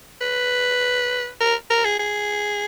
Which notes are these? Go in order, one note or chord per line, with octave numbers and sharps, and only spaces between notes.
B4
A#4
A#4
G#4
G#4